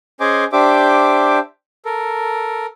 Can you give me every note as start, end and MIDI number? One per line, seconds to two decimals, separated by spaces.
0.20 0.44 61
0.20 0.44 68
0.20 0.44 72
0.20 0.44 75
0.20 0.44 80
0.20 0.44 86
0.52 1.39 62
0.52 1.39 67
0.52 1.39 72
0.52 1.39 76
0.52 1.39 86
1.85 2.66 69
1.85 2.66 70